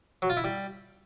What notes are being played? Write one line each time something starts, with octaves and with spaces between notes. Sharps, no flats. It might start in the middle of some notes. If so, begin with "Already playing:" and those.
F#3
F4
E4
G3